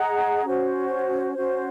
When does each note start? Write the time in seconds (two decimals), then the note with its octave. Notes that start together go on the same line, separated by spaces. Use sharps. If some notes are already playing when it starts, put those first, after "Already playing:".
Already playing: G#4 D#5 F#5 A#5
0.44 C#4 F#4 C5
1.35 C#4 F#4 C5